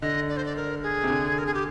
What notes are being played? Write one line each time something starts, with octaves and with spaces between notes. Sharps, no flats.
D3 D#5
D5
C5
D5
A#4
G#4
C3
D3
A#4
G#4
G4